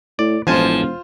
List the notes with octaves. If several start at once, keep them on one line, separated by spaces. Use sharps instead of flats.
A2 D5
E1 A1 F3 F4 C5 G#5 A5